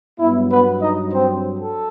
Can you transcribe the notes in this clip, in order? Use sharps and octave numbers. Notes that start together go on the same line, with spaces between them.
G2 F#3 B3 E4
B3 B4
D#4 D#5
C4 C5
A4